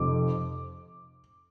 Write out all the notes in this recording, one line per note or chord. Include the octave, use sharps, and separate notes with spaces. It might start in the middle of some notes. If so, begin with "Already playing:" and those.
Already playing: F1 F2 F3 D6